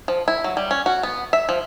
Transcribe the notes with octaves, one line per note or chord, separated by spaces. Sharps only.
F3
E4
F#3
G3
C#4
F#4
B3
E5
F3